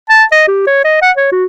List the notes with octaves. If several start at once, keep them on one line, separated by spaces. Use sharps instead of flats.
A5
D#5
G4
C#5
D#5
F#5
C#5
F#4